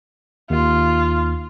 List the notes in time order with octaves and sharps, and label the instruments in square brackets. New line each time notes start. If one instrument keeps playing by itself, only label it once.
[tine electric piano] D#2 [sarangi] F4